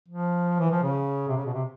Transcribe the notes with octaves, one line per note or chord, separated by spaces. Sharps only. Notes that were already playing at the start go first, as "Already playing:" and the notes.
F3
E3
F3
C#3
C3
C#3
B2
C3